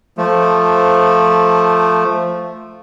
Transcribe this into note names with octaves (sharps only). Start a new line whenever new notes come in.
F3 A3